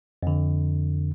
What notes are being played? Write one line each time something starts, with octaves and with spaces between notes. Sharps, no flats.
F2 D3